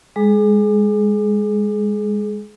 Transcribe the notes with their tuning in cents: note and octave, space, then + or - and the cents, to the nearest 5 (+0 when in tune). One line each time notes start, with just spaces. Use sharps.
G#3 -20 G#4 +30 D6 +35